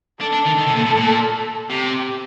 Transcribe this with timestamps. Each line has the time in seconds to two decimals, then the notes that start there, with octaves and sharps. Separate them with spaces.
0.21 D4 A4
0.33 D4
0.46 D#3
0.58 D#3
0.67 C3
0.76 A#2
0.86 A2
0.96 A#2
1.69 C3 G4